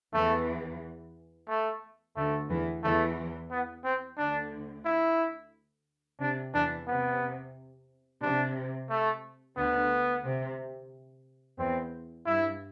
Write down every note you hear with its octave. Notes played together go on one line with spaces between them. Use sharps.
E2 E3 A3
A3
D2 D3 A3
E2 E3
E2 E3 A3
B3
C4
D2 D3 D4
E4
C3 D4
E2 E3 D4
C3 B3
C3 D4
A3
D2 D3 B3
C3
E2 C4
G2 E4